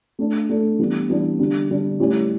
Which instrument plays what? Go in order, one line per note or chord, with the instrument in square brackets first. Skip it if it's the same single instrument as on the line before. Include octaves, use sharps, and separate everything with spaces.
[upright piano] A3 D4 A4
A3 D4 A4
E3 G3 B3 D4
E3 G3 B3 D4
D3 G3 D4
D3 G3 D4
A2 G3 C#4 G4